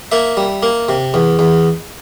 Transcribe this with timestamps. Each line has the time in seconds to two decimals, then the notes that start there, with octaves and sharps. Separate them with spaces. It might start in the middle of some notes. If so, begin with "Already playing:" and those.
0.12 A#3 E5
0.37 G3
0.63 A#3
0.89 C3
1.14 E2
1.39 E2